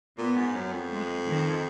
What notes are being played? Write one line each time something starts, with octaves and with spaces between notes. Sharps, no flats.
A#2 B3
G#2
F#2
F2
G#3
D#3